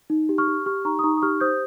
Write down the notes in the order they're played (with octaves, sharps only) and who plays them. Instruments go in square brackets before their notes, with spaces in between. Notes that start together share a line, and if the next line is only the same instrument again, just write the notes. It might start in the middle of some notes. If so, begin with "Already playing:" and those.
[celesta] D#4
G4
C#6 F6
G4
G4 C#6 F6
D#4 A#5 C#6
D#6
D#4 A#5 C#6
D#6
G4 C#6 F6
C5 D#6 G6